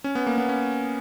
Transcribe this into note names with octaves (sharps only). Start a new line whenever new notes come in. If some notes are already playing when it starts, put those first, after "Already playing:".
C#4
B3
A#3
B3
C#4